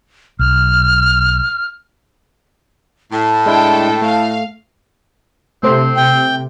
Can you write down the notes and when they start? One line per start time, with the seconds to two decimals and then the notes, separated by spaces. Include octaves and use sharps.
0.39 B1 F6
3.12 A2 A5
3.46 G#3 D4 E4 A4 G5
4.02 A3 F5
5.63 C3 A3 C4 C5
5.97 C3 G5